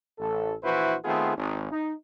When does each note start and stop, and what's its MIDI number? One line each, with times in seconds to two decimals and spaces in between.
0.19 0.54 33
0.19 0.54 69
0.63 0.95 34
0.63 0.95 52
0.63 0.95 64
0.63 0.95 66
0.63 0.95 71
0.63 0.95 72
1.04 1.34 51
1.04 1.34 57
1.04 1.34 59
1.04 1.34 60
1.04 1.34 65
1.04 1.34 68
1.36 1.69 32
1.71 1.92 63